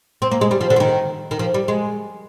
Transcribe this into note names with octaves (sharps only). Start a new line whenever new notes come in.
C4
A#3
G#3
G3
F3
D3
F3
D#3
D#3
F3
G3
G#3